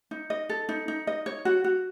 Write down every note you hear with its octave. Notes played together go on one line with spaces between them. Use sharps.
D#4
D#5
A4
D#4
D#4
D#5
C#5
F#4
F#4